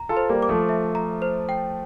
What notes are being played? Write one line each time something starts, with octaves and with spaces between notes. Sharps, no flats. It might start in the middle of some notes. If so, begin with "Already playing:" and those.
Already playing: A#5
F4 A4
C5
G3 A#3
D6
F3 A3
E5
A#5
C5
G5